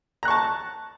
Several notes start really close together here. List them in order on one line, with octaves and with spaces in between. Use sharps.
A#5 F#6 C#6 A5